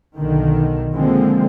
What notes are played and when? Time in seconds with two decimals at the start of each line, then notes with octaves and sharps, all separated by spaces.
0.17 B1 D3 D#3
0.95 D3 F3 G#3 A#3 C4